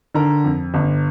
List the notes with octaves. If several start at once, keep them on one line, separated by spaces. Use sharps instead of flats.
D3 A#4 A#5
F2
G1